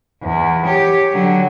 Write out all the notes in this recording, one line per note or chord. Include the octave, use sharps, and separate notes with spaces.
E2
G4 C#5
D3 F#3